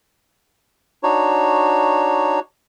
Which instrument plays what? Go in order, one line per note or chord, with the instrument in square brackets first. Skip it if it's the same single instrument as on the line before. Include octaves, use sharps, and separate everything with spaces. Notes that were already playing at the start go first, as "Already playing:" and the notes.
[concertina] D4 D#4 F#4 C#5